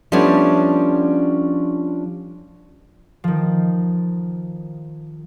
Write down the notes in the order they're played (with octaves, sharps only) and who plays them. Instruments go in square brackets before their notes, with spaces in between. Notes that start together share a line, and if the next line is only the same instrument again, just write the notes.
[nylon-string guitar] F3 G3 A3 B3 C#4 D4
[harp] D#3 F3